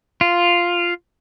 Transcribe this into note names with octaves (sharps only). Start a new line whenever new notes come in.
F4